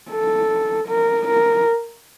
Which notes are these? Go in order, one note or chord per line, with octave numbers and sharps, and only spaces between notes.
A4
A#4
A#4